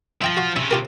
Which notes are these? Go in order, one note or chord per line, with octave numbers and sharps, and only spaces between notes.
F3 E5 G5 A#5
F#4 F5
C3 C#4 E4 E5
F4 G4 A#4